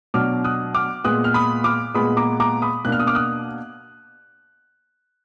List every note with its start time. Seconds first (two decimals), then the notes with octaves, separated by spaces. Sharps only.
0.14 B2 F#3 D4 D6 F6
0.44 D#6 F#6
0.74 D6 F6
1.04 A#2 G#3 B3 D#6 F#6
1.24 F6
1.34 B5 D#6
1.64 D6 F6
1.94 A#2 G#3 B3 B5 D#6
2.17 A#5 D6
2.40 A#5 D6
2.62 B5 D#6
2.85 B2 A#3 D4 F#6
2.92 F6
3.00 D#6
3.07 D6 F6
3.15 D#6 F#6